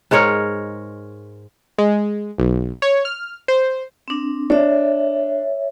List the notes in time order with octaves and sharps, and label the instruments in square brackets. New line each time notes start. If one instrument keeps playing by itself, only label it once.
[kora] G#2 G#3 A#4 C#5
[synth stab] G#3
B1
C#5
F6
C5
[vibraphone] C4 D4
[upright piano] D4 [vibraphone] C#5 E5